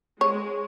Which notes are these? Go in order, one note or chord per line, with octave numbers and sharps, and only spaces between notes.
G#3 C#5